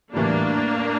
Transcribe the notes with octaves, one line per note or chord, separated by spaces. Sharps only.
A2 E3 G3 A#3 D4